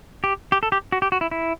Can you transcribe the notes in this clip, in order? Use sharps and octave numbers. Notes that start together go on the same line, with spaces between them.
G4
G4
A4
G4
F#4
G4
F#4
E4
E4